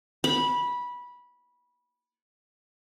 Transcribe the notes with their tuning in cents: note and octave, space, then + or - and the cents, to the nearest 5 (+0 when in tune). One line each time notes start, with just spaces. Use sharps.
B5 -15